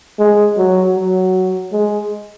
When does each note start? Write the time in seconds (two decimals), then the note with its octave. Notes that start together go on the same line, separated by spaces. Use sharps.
0.19 G#3
0.57 F#3
0.96 F#3
1.73 G#3